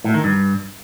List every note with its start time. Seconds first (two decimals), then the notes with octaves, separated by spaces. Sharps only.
0.04 A2
0.14 D#3
0.24 G2